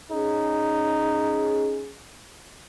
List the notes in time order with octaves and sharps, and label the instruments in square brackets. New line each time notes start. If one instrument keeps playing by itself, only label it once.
[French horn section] C#4 G#4 [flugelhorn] D#4